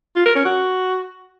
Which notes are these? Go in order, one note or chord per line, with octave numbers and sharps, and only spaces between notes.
F4
A#4
C#4
F#4